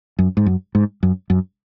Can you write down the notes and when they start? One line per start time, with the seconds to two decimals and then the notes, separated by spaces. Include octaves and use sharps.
0.19 F#2
0.37 G#2
0.46 F#2
0.75 G#2
1.03 F#2
1.30 F#2